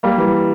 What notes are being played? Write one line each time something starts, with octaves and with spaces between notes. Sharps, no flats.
G3 A#3
E3